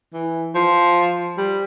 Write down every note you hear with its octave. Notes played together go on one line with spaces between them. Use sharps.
E3
F3
G3